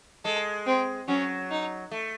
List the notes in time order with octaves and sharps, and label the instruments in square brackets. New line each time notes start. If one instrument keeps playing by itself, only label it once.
[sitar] G#3 [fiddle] A4
[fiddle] C4
[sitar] F#3 [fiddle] C#4
[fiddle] D#4
[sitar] A3